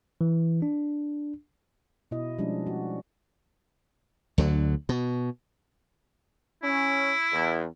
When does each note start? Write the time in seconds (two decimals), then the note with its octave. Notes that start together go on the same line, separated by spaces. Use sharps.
0.21 E3
0.62 D4
2.11 B2 E4 D#5
2.38 F3 G3 G#3 C#4 D4
2.67 F#4
4.38 D2 D3 F#3
4.89 B2
6.63 C#4 E4
7.33 E2